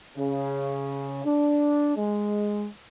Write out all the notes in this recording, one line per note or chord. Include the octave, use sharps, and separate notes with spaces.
C#3
D4
G#3